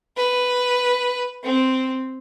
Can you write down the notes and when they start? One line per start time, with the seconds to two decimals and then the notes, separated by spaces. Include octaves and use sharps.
0.17 B4
1.43 C4